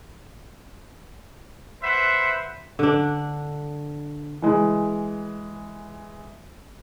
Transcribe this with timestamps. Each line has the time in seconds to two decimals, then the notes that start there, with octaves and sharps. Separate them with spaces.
1.83 B4 C5 E5 F#5
2.79 D3 D4
4.42 E3 G#3